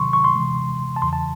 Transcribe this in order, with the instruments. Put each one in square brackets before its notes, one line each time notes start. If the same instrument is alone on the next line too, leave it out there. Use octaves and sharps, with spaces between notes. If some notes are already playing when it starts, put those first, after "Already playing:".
Already playing: [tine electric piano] C3 D#3 F#3 C6 C#6
C#6
C6
C3 E3 G#3
A5
E2 C#3 E3 C6
A5